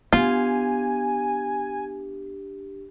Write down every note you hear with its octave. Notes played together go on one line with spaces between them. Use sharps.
B3 D4 F4 G4 G#5